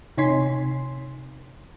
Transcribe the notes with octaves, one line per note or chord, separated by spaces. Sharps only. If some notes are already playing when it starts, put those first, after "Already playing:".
C3 D#4 C#5 G#5 C6 B6